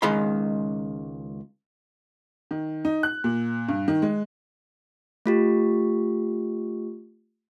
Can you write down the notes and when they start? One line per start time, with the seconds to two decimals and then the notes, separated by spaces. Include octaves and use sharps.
0.02 C#2 D#3 G#3 F5 B5 C6
2.51 D#3
2.85 D#4
3.03 F#6
3.24 A#2
3.69 G2
3.88 D#3
4.02 G#3
5.26 A3 F4 G4